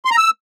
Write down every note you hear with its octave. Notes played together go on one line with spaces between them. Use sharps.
C6
A#5
E6